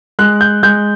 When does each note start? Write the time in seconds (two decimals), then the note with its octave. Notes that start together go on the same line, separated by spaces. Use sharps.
0.19 G#3 F#6
0.41 G6
0.63 G#3 G6